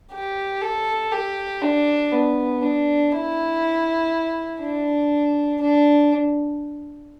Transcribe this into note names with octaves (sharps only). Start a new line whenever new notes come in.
G4
A4
G4
D4
B3
D4
E4
D4
D4